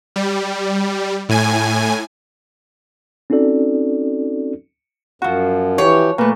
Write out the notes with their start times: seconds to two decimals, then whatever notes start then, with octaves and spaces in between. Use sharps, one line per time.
0.16 G3
1.29 A2 G#5
3.30 C4 C#4 D#4 F#4 A4 D5
5.22 F#2 F3 F#4
5.78 E3 G4 C#5
6.18 A#2 A3 B4